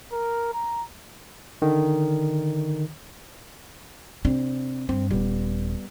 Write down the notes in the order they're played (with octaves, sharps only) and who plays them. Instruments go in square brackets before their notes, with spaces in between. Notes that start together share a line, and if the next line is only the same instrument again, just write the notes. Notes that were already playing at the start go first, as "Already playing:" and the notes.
[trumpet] A#4
A#5
[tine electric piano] D3 D#3
[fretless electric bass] C3 D4 [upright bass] C4
[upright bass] G2 [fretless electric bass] C4
[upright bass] D#1 [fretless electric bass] G3 G#3 B3